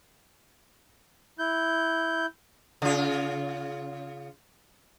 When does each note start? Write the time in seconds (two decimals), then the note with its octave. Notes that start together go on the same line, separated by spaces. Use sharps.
1.39 E4 G6
2.82 C#3 F4